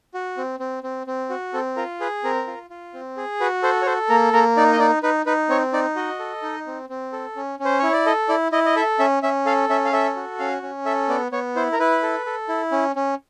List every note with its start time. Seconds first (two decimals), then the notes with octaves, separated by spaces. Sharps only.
0.14 F#4
0.37 C4
0.60 C4
0.83 C4
1.07 C4
1.30 F#4
1.53 C4 A4
1.76 F4 A#4
2.00 G#4 B4
2.24 C4 A#4
2.47 F4
2.70 F4
2.94 C4
3.17 G#4
3.41 F#4 B4
3.63 A4 C5
3.82 C#5
3.86 A4 C5
4.09 A#3 A#4
4.33 A#3 A#4
4.57 D#4 D5
4.72 D#5
4.80 D#4 D5
5.03 D#4 B4
5.26 D#4 B4
5.49 C4 C#5
5.73 D#4 D5
5.96 F#4 D#5
6.19 A4
6.42 D#4
6.67 C4
6.89 C4
7.12 A4
7.36 C#4
7.59 C#4
7.65 C5
7.79 E4 C#5
7.93 D5
8.06 A4 D#5
8.29 E4 D5
8.52 E4 D#5
8.66 D#5
8.76 A4 E5
8.99 C#4 E5
9.23 C#4 E5
9.46 A4 F5
9.69 C#4 E5
9.85 F5
9.93 A4 E5
10.16 F#4
10.39 C#4 F5
10.63 C#4
10.85 A4 E5
11.09 B3 D5
11.32 B3 C#5
11.56 E4 C5
11.72 A#4
11.79 E4 B4
12.03 A4
12.26 A4
12.48 E4
12.72 C#4
12.96 C#4